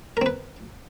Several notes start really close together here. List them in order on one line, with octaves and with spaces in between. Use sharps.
A#4 C4 B4